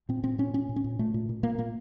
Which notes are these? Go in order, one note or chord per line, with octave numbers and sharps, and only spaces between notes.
A#2 C4
A#2 C4
A#2 C#4
A#2 C#4
A#2
C#4
A#2
A#2 A3
A#2
A#2
A#2 A#3
A#2 A#3